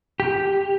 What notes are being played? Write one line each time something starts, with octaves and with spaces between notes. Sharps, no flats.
G4